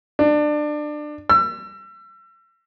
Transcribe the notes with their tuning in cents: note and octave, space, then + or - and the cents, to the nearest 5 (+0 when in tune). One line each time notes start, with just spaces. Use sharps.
D4 +25
E6 +35